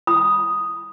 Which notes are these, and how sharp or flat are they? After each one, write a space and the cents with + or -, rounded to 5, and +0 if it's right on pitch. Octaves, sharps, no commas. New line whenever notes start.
B5 -15 D#6 +0